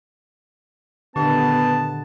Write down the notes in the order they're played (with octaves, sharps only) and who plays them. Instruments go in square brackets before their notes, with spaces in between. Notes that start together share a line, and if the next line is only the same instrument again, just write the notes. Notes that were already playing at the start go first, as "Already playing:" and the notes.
[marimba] A#2 D#3 [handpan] D3 G4 [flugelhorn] B3 [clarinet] A5